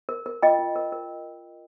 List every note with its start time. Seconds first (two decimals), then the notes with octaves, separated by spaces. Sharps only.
0.09 A#4
0.26 A#4
0.42 F4 D#5 G5
0.59 F4
0.76 A#4
0.92 A#4